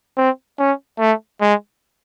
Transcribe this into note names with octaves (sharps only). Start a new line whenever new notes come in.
C4
C#4
A3
G#3